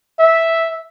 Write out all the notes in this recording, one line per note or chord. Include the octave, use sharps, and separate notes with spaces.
E5